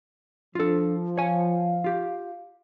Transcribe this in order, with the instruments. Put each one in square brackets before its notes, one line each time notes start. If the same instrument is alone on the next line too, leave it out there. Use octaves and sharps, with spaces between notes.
[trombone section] F3 [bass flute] D4 [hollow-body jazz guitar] F4 A4
[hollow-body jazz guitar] C#5 G#5 [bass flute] F5
[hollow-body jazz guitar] F4 G4